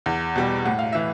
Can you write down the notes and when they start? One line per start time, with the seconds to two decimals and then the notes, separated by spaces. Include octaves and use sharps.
0.06 E2
0.36 B2 G3
0.65 A2 F#5
0.79 F5
0.93 E3 E5